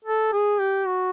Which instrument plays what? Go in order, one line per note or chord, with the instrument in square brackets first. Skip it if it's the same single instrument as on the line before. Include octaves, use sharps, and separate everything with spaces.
[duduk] A4
G#4
G4
F#4